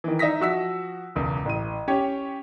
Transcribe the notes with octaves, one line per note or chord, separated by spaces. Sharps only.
D#3 E3
D#4 E5 D#6 A#6 B6
F3 F#4 E6 B6
E1 C#2
A1 D#7
C#4 G4 C#5